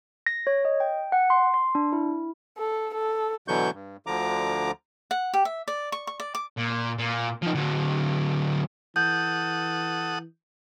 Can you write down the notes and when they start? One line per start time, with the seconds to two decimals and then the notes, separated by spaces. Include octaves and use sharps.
0.26 A#6
0.47 C#5
0.65 D#5
0.80 G5
1.12 F#5
1.30 C6
1.54 C6
1.75 D4
1.93 E4
2.58 A4
2.94 A4
3.48 B2 D3 E3 F#3 C#6 G6
3.74 G2
4.07 D2 D3 F3 A#5 D6
5.11 F#5
5.34 G4
5.45 E5
5.68 D5
5.92 C#6
6.07 C#6
6.20 D5
6.35 D6
6.57 A#2
6.99 A#2
7.42 F3 D#4
7.55 D3 F#3
8.96 E3 A4 F#5 D#6 G6